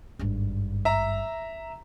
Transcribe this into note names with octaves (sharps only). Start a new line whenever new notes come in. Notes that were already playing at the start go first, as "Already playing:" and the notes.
G#1 G2
E5 A#5